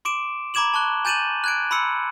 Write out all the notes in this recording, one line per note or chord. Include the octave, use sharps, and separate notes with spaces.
C6 D6 D7 E7
A#5 B5 D6 G#6 E7 F#7
A5 C#6 F#6 G7
G#5 G6 A6 D#7 E7 F#7
F#6 G#6 D7
B5 C6 E6 C#7